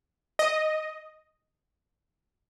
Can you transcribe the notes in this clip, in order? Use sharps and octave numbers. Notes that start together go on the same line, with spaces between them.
D#5